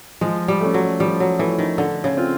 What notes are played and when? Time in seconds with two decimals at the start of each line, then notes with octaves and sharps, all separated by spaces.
0.21 F3 G#3
0.48 G3
0.61 A3 C#4
0.74 F#3
1.00 F3 G3
1.20 F#3
1.39 E3 A3 C#4
1.59 D#3
1.78 D3 A3
2.04 C#3
2.17 C4 F4